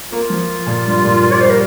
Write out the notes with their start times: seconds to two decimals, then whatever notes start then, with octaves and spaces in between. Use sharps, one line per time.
0.12 A#3 F4
0.30 F3
0.67 A#2
0.86 G2
1.04 A#2
1.22 A#2
1.33 D5
1.41 G3 C5
1.50 A#4